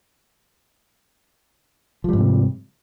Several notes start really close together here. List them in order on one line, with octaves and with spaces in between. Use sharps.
F3 G3 G#2 C3